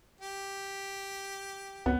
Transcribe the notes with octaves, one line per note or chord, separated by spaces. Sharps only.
G4
C#2 B3